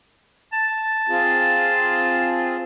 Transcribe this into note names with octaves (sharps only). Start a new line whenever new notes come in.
A5
C4 F4 G#4